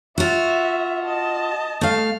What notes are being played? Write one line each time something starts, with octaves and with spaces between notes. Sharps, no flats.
F4 F#4 E5
D#5 A5
A3 F5